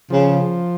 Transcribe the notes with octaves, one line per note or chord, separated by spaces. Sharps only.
C#3 F3